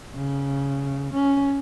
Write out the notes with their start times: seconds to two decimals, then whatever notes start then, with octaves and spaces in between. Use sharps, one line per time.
0.14 C#3
1.13 C#4